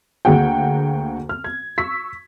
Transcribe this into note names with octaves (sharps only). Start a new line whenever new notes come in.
D2 A#3 F#4 G#4 F#5 G5
F6
G#6
C#6 E6 B6